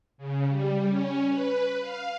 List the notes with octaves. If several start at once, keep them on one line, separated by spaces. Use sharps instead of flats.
C#3
G3
C#4
B4
F5